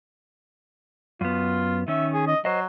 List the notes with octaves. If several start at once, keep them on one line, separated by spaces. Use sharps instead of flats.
F#2 B3 F4
D#3 C#4 E5
G#4
D#5
F#3 C5 D#5